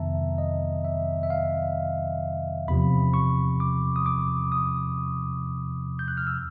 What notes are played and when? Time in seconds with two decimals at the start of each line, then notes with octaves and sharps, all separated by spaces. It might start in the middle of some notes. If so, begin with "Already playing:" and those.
Already playing: F2 C3 D#3 F#3 B3 E5 A5 A#5
0.38 D#5
0.84 E5
1.23 E5
1.30 F5
2.68 E2 C3 F3 B5
3.14 C#6
3.60 D6
3.96 D#6
4.06 D6
4.52 D#6
5.99 G6
6.08 F#6
6.17 F6
6.27 E6